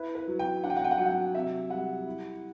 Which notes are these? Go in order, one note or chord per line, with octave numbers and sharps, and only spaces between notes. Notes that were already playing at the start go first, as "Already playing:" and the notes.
Already playing: E4 B4
B4
F#3
G5
D4 F#5
G5
F#5
G5
F#5
F#3 G5
F#5
C3 E5
G3 F#5
E4